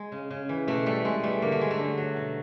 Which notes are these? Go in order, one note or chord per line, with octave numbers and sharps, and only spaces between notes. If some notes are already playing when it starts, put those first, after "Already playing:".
Already playing: G#3
C#3
C#3
E3
B2 A3
G3 A3
B2 G#3
G3 A3
D3 A#3
A3
F#3 G#3
A3
D3
F#3
B2